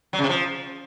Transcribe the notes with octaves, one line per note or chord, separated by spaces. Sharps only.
F#3
C#3
C3
F3